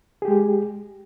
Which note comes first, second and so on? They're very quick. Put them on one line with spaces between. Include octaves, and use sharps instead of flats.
G#4 G4 G#3